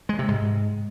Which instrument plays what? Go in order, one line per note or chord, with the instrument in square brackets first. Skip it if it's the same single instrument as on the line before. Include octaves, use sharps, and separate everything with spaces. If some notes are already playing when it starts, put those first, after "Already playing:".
[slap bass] G#3
C3
G#2